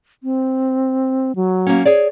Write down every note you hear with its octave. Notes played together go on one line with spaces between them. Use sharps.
C4
F#3
A#3 C#4
G#4 C#5 D5